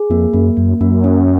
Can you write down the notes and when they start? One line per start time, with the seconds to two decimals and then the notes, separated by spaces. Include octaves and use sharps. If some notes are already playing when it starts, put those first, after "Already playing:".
Already playing: G#4
0.10 F2 A#3
0.33 F#2 A#3
0.57 F#2 A#3
0.80 F#2 A#3
1.04 C#4